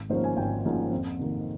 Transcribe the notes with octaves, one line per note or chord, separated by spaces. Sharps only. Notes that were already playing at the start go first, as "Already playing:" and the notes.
Already playing: G#1
G#2 F3 A#3 C#4 C5
G#5
G#1 G5
G#2 F3 A#3 C#4
F2
C3 D#3 A#3